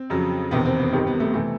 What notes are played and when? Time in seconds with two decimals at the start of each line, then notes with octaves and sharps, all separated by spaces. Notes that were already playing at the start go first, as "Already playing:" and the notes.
Already playing: C4
0.10 F2 C#3 F#3
0.51 E1 E2 C3 D#3 B3
0.65 C4
0.79 B3
0.92 G#1 G2 D#3 G3 C4
1.07 B3
1.20 A3
1.34 C3 E3 A3